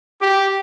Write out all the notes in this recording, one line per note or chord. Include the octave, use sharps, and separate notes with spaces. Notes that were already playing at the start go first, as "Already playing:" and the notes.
G4